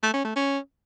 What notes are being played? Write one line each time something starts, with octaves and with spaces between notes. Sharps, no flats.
A3
C#4
A3
C#4